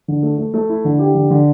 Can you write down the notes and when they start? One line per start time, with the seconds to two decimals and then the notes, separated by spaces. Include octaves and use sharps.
0.08 D3
0.23 A3
0.38 A3
0.54 A3
0.69 E4
0.85 D3
0.99 G4
1.15 D3
1.31 D3